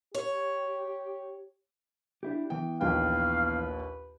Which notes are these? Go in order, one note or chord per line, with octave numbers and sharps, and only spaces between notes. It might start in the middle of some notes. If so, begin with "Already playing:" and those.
G4 C#5
D4 E4 G4
E3 B3 G5
A#1 D#2 B4 F5 G5